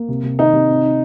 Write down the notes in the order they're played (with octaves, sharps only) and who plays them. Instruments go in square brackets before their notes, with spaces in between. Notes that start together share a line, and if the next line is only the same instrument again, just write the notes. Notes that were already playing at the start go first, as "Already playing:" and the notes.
Already playing: [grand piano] A#3
C3
C3
[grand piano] D#3 [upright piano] D#4
[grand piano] C3
C4
D#4